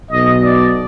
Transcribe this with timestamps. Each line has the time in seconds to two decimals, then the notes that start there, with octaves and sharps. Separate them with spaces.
0.10 B1 B2 D#5
0.43 D5